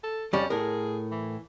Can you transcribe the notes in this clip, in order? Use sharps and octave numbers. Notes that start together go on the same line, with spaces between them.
A4
F2 G3 C#4
A2 G#4 A#4
E3